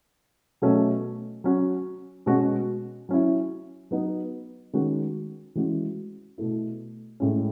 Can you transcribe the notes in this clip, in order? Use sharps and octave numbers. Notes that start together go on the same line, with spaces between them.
B2 F#3 A3 C#4
F#3 C#4 F#4
B2 G#3 C#4 F#4
F#3 C#4 E4
F#3 B3 D#4
D#3 G#3 C#4 F#4
E3 G#3 C#4 F#4
B2 A3 E4
A2 G#3 C#4